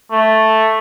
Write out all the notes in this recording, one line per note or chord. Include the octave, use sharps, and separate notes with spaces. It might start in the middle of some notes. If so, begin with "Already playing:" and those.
A3